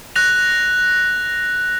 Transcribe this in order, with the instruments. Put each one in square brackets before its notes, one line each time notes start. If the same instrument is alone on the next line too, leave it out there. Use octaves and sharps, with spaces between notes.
[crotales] F#6 A#6 F7